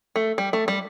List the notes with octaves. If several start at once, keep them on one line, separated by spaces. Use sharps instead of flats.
A3
G3
A3
G3